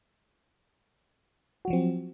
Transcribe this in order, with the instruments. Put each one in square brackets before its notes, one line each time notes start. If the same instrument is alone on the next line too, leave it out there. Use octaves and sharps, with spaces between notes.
[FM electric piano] F#4
F#3
F3
C4